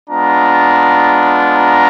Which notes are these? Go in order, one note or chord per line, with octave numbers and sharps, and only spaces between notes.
G#3 B3 D4 F4 A#5
A#5